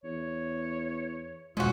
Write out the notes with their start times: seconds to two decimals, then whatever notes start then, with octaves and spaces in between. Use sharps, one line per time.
0.04 E2 C#5
1.57 F1 B2 G#3 C#4 F4 F#4